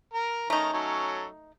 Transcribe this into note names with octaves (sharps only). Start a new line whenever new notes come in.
A#4 A#5
D#3 A3 C#4 D#4 A#5
F#3 C#4 A4